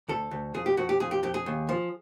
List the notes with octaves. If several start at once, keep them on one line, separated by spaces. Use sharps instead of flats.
D2 A4
D2
F2 G#4
G4
F2 F#4
G4
F2 G#4
G4
F2 G4
G#4
D#2
F3